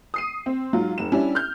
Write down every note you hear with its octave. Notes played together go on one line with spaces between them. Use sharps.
D#6 C7 D#7
C4
G#2 F#3 F4
F1 E7
G3 C#4 D4 E4
F6 G6